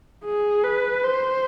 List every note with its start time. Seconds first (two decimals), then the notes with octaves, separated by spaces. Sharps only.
0.25 G#4
0.64 B4
1.03 C5